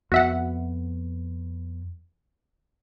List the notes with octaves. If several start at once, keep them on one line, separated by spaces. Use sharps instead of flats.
F2 B3 F#4 E5 F#5